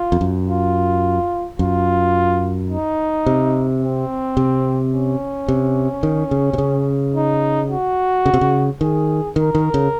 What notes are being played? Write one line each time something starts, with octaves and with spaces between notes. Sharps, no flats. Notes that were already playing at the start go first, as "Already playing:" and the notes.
Already playing: F4
F2
F#2
F4
F#2 F4
D#4
C3
C4
C3
C#4
C3
D#3
C#3
C3
C#3
D#4
F#4
C#3
C3
C#3
D#3 G#4
D#3 A#4
D#3
C#3